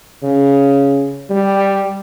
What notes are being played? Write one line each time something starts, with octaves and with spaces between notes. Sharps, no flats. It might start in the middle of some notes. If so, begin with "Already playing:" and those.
C#3
G3